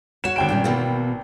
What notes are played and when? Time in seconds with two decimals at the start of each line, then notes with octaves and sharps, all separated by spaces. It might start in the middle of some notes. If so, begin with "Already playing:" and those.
0.24 F#4 C#5 F#5 E7
0.36 G#1 G5 D7
0.49 G2 A#2 C#4
0.64 B2 E3 A#3